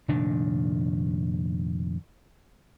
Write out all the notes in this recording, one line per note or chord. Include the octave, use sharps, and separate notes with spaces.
F1 A#2 D#3 D4